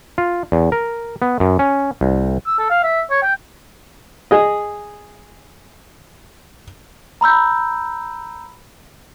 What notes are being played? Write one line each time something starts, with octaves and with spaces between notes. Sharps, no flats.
F4
E2
A#4
B3
F#2
C#4
C2
E6
A4
F5
E5
C#5
G5
G#4 D#5
A#5 B5 E6 G6